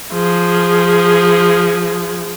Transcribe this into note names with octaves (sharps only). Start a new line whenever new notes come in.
F3 G#4